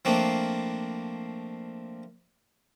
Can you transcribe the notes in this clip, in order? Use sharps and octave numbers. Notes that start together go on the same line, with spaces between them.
F3 A3 A#3 C4 D4